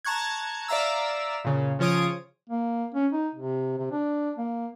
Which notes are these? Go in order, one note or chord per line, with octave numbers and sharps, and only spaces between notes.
A5 A#5 C#6 F#6 G#6
D5 E5 F5 A#5 E6
A#2 C#3
C#3 F3 F4 C#5 D#6 D7
A#3
C#4
D#4
C3
C3
D4
A#3